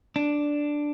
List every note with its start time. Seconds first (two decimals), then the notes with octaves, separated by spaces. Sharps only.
0.16 D4